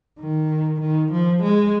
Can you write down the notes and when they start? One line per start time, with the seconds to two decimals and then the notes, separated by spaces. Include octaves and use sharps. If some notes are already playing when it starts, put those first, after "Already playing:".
0.20 D#3
0.81 D#3
1.11 F3
1.43 G#3